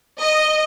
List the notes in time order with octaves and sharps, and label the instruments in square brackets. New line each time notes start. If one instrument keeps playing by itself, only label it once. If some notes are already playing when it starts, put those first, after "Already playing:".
[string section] D#5